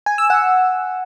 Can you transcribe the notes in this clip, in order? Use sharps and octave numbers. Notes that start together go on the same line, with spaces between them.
G#5
E6
F#5